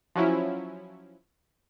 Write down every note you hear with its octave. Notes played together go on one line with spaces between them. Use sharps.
F3 F#3 C#4 E4